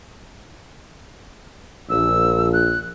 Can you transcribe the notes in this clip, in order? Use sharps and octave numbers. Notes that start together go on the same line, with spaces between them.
A#1 E6
F#6